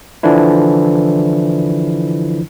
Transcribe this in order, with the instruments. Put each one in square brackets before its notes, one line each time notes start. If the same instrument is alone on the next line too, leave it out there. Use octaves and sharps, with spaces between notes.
[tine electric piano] D3 E3 F3 D4 E4